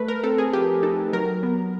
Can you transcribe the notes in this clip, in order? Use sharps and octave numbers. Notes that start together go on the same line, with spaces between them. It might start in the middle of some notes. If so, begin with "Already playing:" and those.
Already playing: A3 B4
A#4
C4 A4
G#4
F3 G4
D#4 A4
F#3 A#4
B3